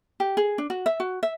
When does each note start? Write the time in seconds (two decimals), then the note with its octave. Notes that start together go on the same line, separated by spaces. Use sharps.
0.20 G4
0.37 G#4
0.58 D4
0.70 F#4
0.86 E5
1.00 F#4
1.23 E5